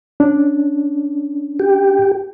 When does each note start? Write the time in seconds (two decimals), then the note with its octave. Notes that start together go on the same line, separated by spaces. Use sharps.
0.20 C#4 D4
1.60 G4